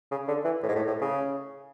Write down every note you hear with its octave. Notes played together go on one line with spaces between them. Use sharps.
C#3
D3
E3
A2
G#2
A2
A2
C#3